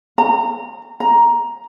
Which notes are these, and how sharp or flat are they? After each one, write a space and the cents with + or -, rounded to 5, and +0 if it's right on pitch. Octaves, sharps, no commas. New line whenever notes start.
A#5 -25
A#5 +10